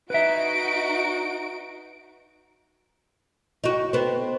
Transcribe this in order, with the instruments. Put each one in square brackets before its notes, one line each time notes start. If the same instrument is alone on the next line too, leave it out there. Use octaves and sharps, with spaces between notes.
[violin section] D#4 F#4 D7 [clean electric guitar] B4 E5
[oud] D#4 F#4
B3 C4